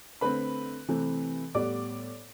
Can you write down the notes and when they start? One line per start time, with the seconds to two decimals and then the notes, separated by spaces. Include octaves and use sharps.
0.21 D3 A3 C4 B4 B5
0.88 C3 E3 A3 C4
1.55 A2 G3 B3 D5 D6